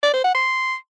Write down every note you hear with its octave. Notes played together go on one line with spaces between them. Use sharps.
D5
C5
F#5
C6